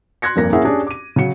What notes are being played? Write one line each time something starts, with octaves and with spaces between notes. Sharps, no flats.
C6 F#6 G#6 A#6 C#7
F1 G2 A#3 A#6
A#3 C#4 E4 G#4 E5 F#5
C#4 D4 G4 G#4
D6 D#7
C#3 F#3 C#7